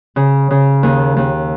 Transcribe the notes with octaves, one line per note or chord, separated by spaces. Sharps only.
C#3
C#3
D#2
D#2